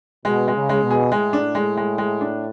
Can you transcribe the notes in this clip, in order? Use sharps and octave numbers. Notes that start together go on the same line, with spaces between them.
B2 G#3
G#3
C#3
G#3
B2
G#4
A2 G#3
D4
G#3
G#3
G#3
D4